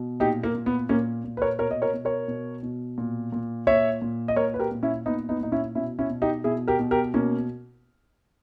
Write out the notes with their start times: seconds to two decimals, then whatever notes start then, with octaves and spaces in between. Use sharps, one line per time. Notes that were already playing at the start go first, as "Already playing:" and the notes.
Already playing: B2
0.20 A#2 D#4 G4
0.43 A#3
0.55 A#2
0.66 B3
0.89 A#2 A#3 C#4
1.24 A#2
1.37 B4
1.42 A#4 C#5
1.59 B2 A#4 C#5
1.71 D#5
1.82 A#4 C#5
1.94 B2
2.05 A#4 C#5
2.28 B2
2.63 B2
2.98 A#2
3.32 A#2
3.67 A#2 C#5 E5
4.02 A#2
4.28 D#5
4.36 A#2 A#4 C#5
4.54 B4
4.59 G4 A#4
4.71 A#2
4.83 C#4 E4
5.06 A#2 B3 D#4
5.29 B3 D#4
5.41 A#2 D#4
5.52 C#4 E4
5.75 B2 C#4 E4
5.99 C#4 E4
6.10 B2
6.22 D#4 G4
6.44 B2 E4 G#4
6.68 G4 A#4
6.79 B2
6.91 G4 A#4
7.14 B2 A#3 C#4